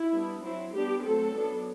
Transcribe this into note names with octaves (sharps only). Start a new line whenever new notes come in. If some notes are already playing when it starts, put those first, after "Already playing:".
Already playing: E4
G3 B3 D4
F#3 C4 E4
G3 B3 D4 G4
F#3 A3 C4 A4
F#3 B3 D4